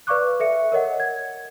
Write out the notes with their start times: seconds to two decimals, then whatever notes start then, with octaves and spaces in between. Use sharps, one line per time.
0.07 B4 D5 F5 C#6 D6 F#6
0.40 A4 E5 C#7
0.72 A#4 C#5 D#5 F#5
1.00 G#6